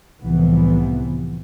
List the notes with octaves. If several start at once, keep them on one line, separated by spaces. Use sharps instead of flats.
C2 A2 C3 E3 F3 B3